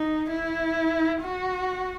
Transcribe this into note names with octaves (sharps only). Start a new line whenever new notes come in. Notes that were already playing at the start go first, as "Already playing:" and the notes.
Already playing: D#4
E4
F#4